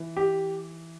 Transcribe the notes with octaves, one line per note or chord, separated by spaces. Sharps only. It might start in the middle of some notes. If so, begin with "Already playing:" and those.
Already playing: E3
G4